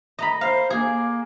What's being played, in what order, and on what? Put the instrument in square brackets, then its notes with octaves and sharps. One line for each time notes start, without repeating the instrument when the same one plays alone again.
[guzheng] D#5 A#5 B5
[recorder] C5 [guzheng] F5
[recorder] A#3 [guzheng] G#4